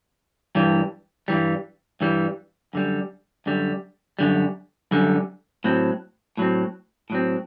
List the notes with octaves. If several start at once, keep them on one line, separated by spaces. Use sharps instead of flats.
G2 E3 G3
G2 E3 G3
G2 E3 G3
F#2 D3 G3
F#2 D3 G3
F#2 D3 G3
F#2 D3 G3
A2 F#3 C4
A2 F#3 C4
A2 F#3 C4